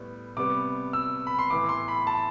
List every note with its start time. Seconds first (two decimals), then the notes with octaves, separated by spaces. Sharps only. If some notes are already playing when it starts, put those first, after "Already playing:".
Already playing: A2 G3 B3
0.37 C3 G3 B3 D6
0.93 E6
1.27 B5
1.39 C6
1.50 A2 E3 B3 D6
1.69 C6
1.88 B5
2.07 A5